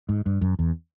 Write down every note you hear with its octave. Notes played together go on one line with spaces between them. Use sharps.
G#2
G2
F#2
E2